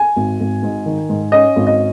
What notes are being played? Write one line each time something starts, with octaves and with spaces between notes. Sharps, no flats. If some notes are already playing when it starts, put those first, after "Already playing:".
Already playing: G#5
G#1
G#1
G#2
D#3
G#2
C#4 D#5
G#1
D#5